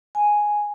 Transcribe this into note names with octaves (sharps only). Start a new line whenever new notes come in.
G#5